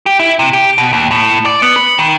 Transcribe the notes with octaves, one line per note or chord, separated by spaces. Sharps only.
G4
E4
C3
G4
B2
D#2
A2
D5
B3
B5
D#3